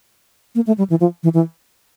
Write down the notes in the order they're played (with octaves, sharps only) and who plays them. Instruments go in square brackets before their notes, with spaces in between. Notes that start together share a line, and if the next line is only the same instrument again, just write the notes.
[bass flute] A#3
A3
G3
E3
F3
E3
E3